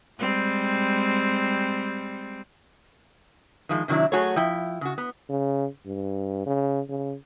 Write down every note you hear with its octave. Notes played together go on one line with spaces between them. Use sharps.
G3 G#3 C4
D#3 F3 G#3
C3 D#3 F#3 D4 E4
F#3 A3 F#4 G#4 A4 C#5
F3 E4 G5
C#3 F#4
B3
C#3
G2
C#3
C#3